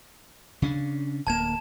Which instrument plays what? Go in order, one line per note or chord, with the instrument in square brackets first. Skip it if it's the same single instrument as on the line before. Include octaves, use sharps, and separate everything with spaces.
[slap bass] C#3 C#4 D4
[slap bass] D1 A#3 [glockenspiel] A5 G#6 E7